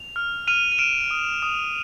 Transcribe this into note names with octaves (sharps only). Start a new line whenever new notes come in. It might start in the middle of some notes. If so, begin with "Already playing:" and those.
Already playing: F7
F6
F6 D#7 F7
D#7
F6 D7 E7
D#6
D#6